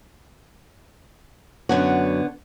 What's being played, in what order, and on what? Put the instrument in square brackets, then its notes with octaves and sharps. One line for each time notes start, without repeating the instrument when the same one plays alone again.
[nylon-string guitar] F#2 F#4 [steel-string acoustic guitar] D3 B3 C#5